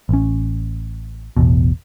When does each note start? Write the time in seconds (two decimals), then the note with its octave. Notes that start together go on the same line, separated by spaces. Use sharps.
0.09 A1 C#4
1.37 E1 A1 E2 B2